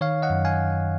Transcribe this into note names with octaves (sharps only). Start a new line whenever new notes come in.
D#3 C#5 F5
D#5 F#5
F#2
F5 G#5